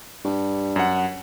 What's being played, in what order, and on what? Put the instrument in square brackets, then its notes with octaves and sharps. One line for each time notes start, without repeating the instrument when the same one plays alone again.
[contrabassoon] G2
[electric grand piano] F#2 F#5